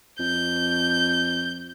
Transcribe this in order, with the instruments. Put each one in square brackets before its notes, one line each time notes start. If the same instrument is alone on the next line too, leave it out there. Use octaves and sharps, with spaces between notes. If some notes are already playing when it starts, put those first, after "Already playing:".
[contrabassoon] F2 [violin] G6